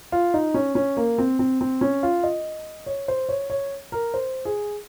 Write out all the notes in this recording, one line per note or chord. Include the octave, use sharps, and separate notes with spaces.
F4
D#4
C#4
C#4
A#3
C4
C4
C4
C#4
F4
D#5
C#5
C5
C#5
C#5
A#4
C5
G#4